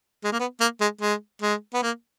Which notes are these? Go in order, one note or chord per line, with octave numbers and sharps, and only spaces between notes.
G#3
A#3
B3
A#3
G#3
G#3
G#3
B3
A#3